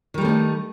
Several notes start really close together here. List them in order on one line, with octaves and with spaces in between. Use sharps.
D#3 G3 A3 C#4 D#4